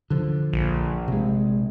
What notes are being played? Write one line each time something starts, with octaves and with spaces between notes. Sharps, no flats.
D3 F3
A#1
C3 G#3